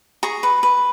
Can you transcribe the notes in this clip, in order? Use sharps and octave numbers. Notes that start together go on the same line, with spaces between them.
G#4 A#5 C#6
B4
B4